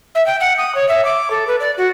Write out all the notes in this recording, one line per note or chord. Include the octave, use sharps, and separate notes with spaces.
E5
G5
F#5
D#6
C#5
E5
D6
A4
B4
D5
F#4